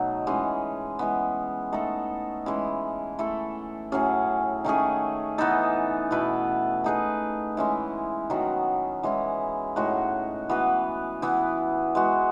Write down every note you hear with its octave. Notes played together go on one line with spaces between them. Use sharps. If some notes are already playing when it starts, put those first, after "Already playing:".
Already playing: B2 F#3 A3 D#4
E3 G#3 C#4 G#4
E3 G#3 B3
A3 D#4 A4
E3 G#3 C#4 E4
A3 E4 A4
A2 F#3 C#4 G#4
D#3 A3 C#4 G#4
E3 B3 D#4 A4
B2 A3 E4 B4
A3 D#4 G#4 B4
E3 G#3 C#4 E4
D#3 F#3 B3 F#4
E3 G#3 C#4 E4
A2 G#3 D#4 F#4
E3 B3 F#4 B4
E3 B3 E4
G#3 B3 F#4